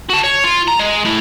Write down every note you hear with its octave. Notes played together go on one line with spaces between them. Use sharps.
F#4 A5
C#5
F4
A#5
G#3
A3 E4